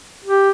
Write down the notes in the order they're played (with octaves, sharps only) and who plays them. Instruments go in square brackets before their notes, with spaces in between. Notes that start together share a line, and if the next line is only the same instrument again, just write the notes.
[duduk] G4